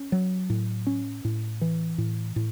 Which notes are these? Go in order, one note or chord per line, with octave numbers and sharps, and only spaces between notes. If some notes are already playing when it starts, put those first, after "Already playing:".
Already playing: C#4
F#3
A2
C#4
A2
E3
A2
A2